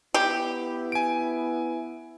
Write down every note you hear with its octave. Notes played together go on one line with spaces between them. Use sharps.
B3 E4 G4
G#5 D7